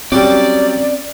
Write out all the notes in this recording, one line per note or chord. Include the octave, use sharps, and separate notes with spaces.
F#3 G3 C4 C#4 D5